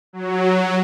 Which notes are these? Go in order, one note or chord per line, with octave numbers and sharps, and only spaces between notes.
F#3